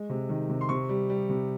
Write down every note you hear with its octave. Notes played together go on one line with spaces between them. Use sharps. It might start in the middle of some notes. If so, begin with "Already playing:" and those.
Already playing: G#3
C3
D#3
C3
C6
C3 C#6
G3
G3
C3